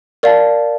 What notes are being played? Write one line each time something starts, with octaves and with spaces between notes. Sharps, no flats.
A#4 D5 F5 A5